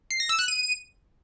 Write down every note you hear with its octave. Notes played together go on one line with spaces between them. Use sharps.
C7
A#6
E6
F#6
D#7